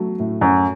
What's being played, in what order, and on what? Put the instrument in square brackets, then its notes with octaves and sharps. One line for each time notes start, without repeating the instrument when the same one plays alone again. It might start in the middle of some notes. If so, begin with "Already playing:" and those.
Already playing: [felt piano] F#3 A3
A2
[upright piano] F#2